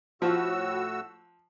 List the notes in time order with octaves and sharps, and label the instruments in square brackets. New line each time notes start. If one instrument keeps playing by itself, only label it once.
[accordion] A2 F#4 E6 [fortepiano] F3